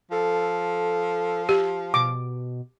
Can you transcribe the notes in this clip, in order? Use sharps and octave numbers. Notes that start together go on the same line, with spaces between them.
F3 A4
G4
B2 D6